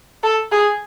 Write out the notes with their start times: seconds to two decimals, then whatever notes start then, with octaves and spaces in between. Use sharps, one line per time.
0.23 A4
0.52 G#4